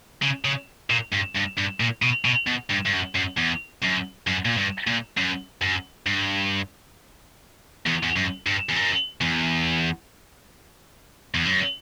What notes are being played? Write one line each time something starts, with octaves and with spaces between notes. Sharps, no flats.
C#3
C#3
A#2
G2
G2
G2
A#2
B2
B2
B2
G2
G2
F#2
F#2
E2
F#2
F#2
A#2
G2
A#2
F#2
F#2
G2
E2
E2
F#2
G2
E2
F#2
E2
E2
F#2